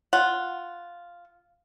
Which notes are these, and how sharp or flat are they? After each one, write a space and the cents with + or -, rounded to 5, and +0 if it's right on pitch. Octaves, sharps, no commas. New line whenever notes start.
F4 +0 F#5 +0